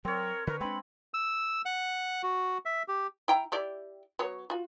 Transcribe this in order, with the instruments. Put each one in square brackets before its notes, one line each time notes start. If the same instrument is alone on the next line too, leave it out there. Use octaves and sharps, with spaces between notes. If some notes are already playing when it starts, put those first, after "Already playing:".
[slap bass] F#3 [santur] C4 C#5 [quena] A#4
[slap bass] D3 [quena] A#4 [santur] B4
[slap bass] G#3 D4 [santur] C4 [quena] B5
[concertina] E6
F#5
F#4
E5
G4
[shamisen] E4 G5 A#5
E4 G4 D5
F#3 B3 C#5
F4 F#4